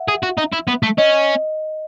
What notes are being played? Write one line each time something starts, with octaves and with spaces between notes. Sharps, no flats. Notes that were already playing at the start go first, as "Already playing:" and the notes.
Already playing: E5 F#5
G#4
F#4
D#4
E4
B3
A3
C#4 D#5